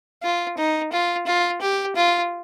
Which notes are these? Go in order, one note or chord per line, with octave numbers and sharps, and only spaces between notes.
F4
D#4
F4
F4
G4
F4